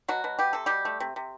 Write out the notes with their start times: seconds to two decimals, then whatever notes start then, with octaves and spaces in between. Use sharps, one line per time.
0.08 B2 F#3 F#4
0.24 B2
0.39 B3 G4
0.53 C3 A4
0.66 B2 G3 G4
0.85 A3
1.00 C3
1.16 C3